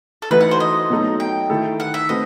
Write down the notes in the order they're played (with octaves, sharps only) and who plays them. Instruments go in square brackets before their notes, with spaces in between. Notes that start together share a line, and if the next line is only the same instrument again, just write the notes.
[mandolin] A4
[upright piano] E3 A3 D#4 F#4 [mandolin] B4
[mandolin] F#5
C5
D#5
[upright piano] B2 F#3 A3 D#4 A4
[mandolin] G5
[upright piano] D#3 A3 E4 A4
[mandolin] F#5
E5
[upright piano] A3 C4 F#4 B4 [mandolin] D#5